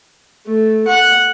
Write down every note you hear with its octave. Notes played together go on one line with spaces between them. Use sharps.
A3
F#5